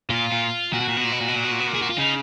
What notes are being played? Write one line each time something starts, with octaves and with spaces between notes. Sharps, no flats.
A#2 F4
A#2
A#2 F#4
B2
A#2
B2
A#2
B2
A#2
B2
A#2
B2
A#2
B2
A#2
G#4
F#4
F4
C#3 D#4